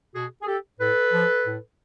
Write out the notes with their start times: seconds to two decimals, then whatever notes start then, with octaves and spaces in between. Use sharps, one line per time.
0.15 B2 F#4 G#4
0.42 G#4
0.47 G4 A4
0.80 A2 A4 B4
1.12 F3
1.45 A2